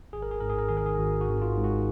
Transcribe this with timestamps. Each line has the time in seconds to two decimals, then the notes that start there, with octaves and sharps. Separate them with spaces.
0.13 G#1 G#4
0.22 A#4
0.31 G#4
0.40 G#2 A#4
0.50 G#4
0.59 A#4
0.68 D#3 G#4
0.77 A#4
0.86 G#4
0.98 G#1 F#4
1.21 F#4
1.28 G#1
1.42 F4
1.57 G#2
1.64 F#4